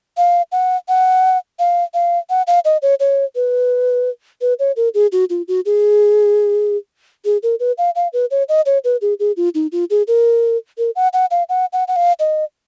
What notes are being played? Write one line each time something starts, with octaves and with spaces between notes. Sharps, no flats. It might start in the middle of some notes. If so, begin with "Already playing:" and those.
F5
F#5
F#5
F5
F5
F#5
F5
D#5
C#5
C#5
B4
B4
C#5
A#4
G#4
F#4
F4
F#4
G#4
G#4
A#4
B4
F5
F5
B4
C#5
D#5
C#5
B4
G#4
G#4
F4
D#4
F4
G#4
A#4
A#4
F#5
F#5
F5
F#5
F#5
F#5
F5
D#5